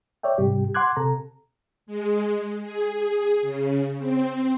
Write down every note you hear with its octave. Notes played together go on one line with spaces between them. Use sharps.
C#5 D5 E5 G5
G#2 C3 G3 G4
F#5 C6 D6 F#6 G#6
C3 A4 A#5
G#3
G#4
C#3
C4